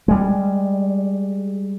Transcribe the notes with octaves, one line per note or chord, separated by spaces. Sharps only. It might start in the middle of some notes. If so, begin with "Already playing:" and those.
G3 G#3